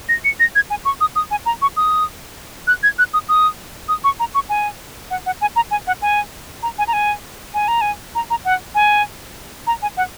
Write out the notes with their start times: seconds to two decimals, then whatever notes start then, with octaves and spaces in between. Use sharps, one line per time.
0.09 A#6
0.25 C#7
0.40 A#6
0.55 G#6
0.70 G#5
0.85 C#6
1.01 D#6
1.16 D#6
1.31 G#5
1.46 A#5
1.62 C#6
1.77 D#6
2.67 F#6
2.83 G#6
2.99 F#6
3.14 D#6
3.29 D#6
3.89 D#6
4.04 C#6
4.20 A#5
4.35 C#6
4.49 G#5
5.11 F#5
5.26 F#5
5.41 G#5
5.56 A#5
5.71 G#5
5.87 F#5
6.02 G#5
6.63 A#5
6.78 G#5
6.88 A#5
6.93 G#5
7.54 G#5
7.68 A#5
7.81 G#5
8.15 A#5
8.30 A#5
8.45 F#5
8.75 G#5
9.67 A#5
9.82 G#5
9.97 F#5